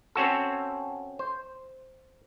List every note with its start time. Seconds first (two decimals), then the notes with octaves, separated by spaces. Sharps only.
0.15 C4 C#4 F#4 A4
1.19 C5